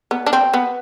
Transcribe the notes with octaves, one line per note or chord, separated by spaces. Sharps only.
B3
D4
C4
B3